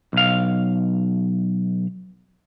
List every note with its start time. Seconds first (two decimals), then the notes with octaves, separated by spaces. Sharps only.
0.13 B1 F5